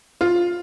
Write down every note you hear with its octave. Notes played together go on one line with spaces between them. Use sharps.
F4